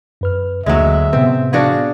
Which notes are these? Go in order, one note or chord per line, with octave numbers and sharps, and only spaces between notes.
F#2 B4 F6
D2 D3 F#3 G#3 A#3 E5
A2 C3 B3 C4
D4 F#4 G#4 F5